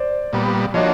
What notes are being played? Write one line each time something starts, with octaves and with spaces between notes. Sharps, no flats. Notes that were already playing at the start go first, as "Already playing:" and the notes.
Already playing: C5 D5
A#2 G3 B3
F3 A#3 D4 F#4 C#5 D#5